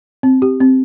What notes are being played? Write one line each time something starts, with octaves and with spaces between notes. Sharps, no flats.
C4
G4
C4